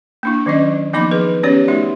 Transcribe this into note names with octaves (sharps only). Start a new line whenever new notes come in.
A#3 D4 E4
D#3 F#3 C#4 D#5
F3 A#3 B3 D#4 B5 D6
F3 G#4 B4
B3 C#4 G4 C#5 D5
A3 D#4 F#4 E5